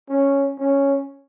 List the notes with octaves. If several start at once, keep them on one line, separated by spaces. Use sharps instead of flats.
C#4
C#4